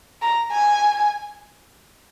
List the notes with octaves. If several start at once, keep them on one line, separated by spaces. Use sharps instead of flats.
A#5
G#5